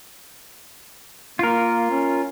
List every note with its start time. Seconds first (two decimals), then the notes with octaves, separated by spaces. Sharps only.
1.39 A#3 F4 A#4
1.90 C#4